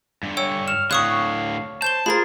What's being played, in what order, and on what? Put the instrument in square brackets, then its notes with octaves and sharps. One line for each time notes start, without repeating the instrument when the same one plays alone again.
[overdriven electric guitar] G2 D3
[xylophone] C#5 G5 E6 [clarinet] C#6
[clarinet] F6 [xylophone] E7
[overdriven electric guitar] A2 D3 [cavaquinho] C#5 [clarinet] F5 [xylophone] C#6 D#6 F#6
[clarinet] C5 [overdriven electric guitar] A5 [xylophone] G6 E7 G7
[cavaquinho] F4 A#4 C5 [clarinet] G#4 [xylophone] B5 A6